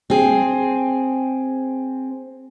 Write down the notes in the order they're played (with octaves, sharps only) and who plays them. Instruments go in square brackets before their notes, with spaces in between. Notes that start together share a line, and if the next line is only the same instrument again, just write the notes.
[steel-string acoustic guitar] C4 G#4